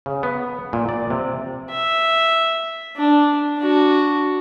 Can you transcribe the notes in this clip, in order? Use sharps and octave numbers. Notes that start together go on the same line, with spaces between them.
C#3
B3
A#2
D5
C3
E5
D4
D4 F#4